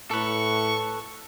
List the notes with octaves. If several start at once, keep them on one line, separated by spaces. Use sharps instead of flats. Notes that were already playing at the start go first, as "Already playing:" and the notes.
A2 A4 B4 C#6